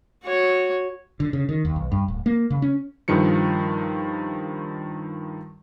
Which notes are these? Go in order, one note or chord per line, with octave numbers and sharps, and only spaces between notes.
F#4 C#5
D3
C#3
D#3
D#2
B1
G2
D1
A#3
C#3
C#4
G2 D#3 F3 C#7